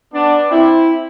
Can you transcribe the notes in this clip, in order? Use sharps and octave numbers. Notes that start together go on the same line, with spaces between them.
B3 D4
C4 E4